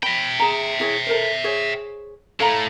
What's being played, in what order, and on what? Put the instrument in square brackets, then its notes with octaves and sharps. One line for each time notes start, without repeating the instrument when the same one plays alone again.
[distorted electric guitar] E5 G5 [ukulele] B5
[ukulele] G#4 A#5
E4 G#4 C#5
A4 A#4 C5
G#4 C5 C#5
[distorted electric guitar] A2 [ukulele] A4 F5 A#5